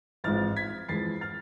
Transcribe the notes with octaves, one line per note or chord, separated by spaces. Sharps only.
A1 G#2 F3 G#3 C4 F6 A6
G#6 B6
F2 E3 G#3 A6 C7
F6 A6